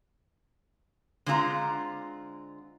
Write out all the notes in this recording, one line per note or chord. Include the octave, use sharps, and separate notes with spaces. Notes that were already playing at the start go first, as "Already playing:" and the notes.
D3 G#3 C4 F4 A#5